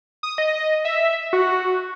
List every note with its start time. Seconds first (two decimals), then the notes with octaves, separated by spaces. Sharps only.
0.23 D#6
0.38 D#5
0.85 E5
1.33 F#4